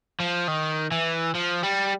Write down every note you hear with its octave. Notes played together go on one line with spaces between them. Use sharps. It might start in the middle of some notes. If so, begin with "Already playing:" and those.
F3
D#3
E3
F3
G3